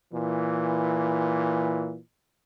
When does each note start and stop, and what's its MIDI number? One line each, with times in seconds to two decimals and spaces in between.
0.13 1.96 46
0.13 1.96 52